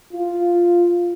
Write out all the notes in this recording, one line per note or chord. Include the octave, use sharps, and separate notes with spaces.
F4